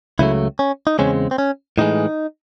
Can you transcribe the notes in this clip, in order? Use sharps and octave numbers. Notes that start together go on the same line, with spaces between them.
C#2 C#3 F#3 A3 E4
C#4
D#4
E2 C#3 G#3 C4 C#4
C4
C#4
A2 E3 G#3 D#4